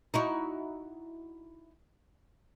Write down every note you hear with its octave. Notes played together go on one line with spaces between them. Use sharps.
D#4 E4 F#4